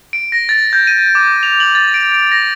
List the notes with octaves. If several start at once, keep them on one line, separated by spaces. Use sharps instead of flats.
D7
A#6
A6
G6
D#7
D6
F7
F#7
A6
D7
D7
A#6